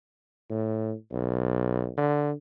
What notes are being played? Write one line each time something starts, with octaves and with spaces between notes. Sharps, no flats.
A2
B1
D3